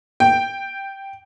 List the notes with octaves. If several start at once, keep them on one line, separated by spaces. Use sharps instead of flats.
G5